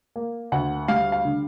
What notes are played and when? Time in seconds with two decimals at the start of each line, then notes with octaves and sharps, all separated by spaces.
0.16 A#3
0.52 D2 F#5
0.88 G3 F5
1.12 F5
1.25 D3